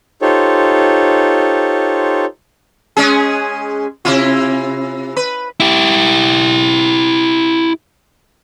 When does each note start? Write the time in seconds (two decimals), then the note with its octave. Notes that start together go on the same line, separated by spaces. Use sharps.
0.22 D#4 F4 G4 A4 C5 C#5
2.97 G#3 C#4 G#4
4.05 C3 E4 F4
5.16 B4
5.60 E4 G4